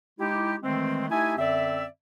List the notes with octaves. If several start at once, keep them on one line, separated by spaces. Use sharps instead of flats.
G#3 D#4 E4 G4
D#3 E3 G#3 A3 C4
A3 D#4 E4 G4 E5 G#5
F#2 D3 C4 D5 E5